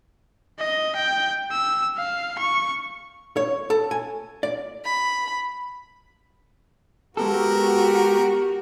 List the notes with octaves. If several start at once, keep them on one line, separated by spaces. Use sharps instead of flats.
D#5
G5
E6
F5
C#6
C#5
A4
G#5
D5
B5
G#3 B3 F#4 G4 A4 A#4